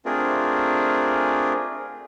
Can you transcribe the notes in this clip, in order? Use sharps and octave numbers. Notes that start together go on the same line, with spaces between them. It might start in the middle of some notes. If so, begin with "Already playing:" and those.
A3 C4 D4 F4 G#4 A#4